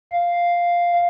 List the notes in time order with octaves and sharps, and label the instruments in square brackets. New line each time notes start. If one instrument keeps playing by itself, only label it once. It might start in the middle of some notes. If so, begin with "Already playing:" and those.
[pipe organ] F5